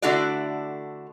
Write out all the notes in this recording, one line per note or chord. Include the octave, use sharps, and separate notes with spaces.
D3 A3 D4 E4 F#4 D5